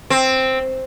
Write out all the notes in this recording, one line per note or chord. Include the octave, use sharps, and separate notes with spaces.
C4